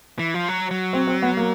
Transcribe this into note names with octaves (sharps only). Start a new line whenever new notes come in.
E3
F3
F#3
F#3
C4
C4
B3
A#3